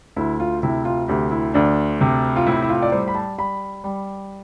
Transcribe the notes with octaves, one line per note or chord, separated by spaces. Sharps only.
D2 E4
F4
C3 E4
F4
D2 G4
E4
D2 D4
C3
F4
A2 E4
E4
F4
D5
G3 C5
B5
A5
G3 B5
G3